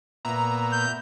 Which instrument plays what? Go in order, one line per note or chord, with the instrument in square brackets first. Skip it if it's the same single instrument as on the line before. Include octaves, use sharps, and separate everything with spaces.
[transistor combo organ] A#2 B3 E5 [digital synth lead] A#5
[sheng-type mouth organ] G6